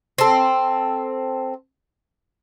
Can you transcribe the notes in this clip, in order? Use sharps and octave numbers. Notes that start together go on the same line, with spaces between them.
C4 A4